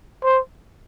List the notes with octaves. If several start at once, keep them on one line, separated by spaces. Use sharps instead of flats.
C5